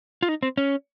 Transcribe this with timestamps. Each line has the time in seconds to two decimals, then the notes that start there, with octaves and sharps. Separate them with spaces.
0.23 F4
0.29 D#4
0.43 C4
0.57 C#4